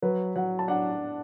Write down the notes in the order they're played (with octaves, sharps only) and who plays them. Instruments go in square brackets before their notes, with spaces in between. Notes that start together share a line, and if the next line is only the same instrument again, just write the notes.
[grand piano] F#3 [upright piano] B4
[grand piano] F#3 [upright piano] F#5
[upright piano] A5
[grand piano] D4 [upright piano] F#5